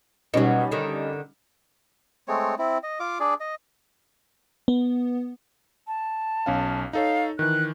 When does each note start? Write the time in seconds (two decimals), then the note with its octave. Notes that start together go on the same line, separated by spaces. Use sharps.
0.34 B2 F#3 G3 C#4 D#4
0.72 D3 D#3
2.28 G#3 A3 C4 C#5
2.59 C4 E4
2.83 D#5
3.00 F4 F5 D6
3.20 D4 G#4 D5
3.40 D#5
4.68 B3
5.87 A5
6.46 B1 C#4 F5
6.93 D#4 A4 C#5 F5
7.39 D#3 E3 F#6